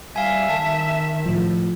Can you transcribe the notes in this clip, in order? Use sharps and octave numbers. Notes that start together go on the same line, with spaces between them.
G3 E5 F5 G#5
D#3 A5
A2 F3